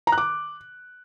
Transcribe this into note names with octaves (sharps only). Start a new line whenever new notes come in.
A#5
F#6
D6